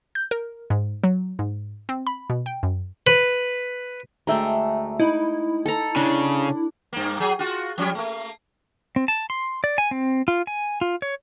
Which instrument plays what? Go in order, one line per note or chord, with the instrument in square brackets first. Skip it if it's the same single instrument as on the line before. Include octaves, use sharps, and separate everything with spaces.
[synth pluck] G6
A#4
G#2
F#3
G#2
C4
B5
B2
G5
F#2
[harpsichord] B4
[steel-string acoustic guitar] D2 E5 A#5 [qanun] G#3 A3 G5
[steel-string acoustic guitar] D#4 [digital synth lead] E4
[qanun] A4 A#5
[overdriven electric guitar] C#3 [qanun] D4
[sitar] G2 A#3
F#3 G#4
F4 F#4
F3 G3 C#4
A3 A#3
[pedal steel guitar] C4
A5
C6
D5
G#5
C4
F4
G#5
F4
C#5